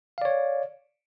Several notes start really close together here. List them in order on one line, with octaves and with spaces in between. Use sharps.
F5 D5 C#5